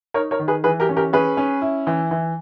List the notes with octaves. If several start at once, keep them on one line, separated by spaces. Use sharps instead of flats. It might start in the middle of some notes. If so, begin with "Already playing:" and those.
D#4 A#4 C#5
A#4 C#5
D#3
G#4 B4
E3 G#4 B4
G4 A#4
C#4
G4 A#4
C#4 G#4 B4
C#4
E4
E3
E3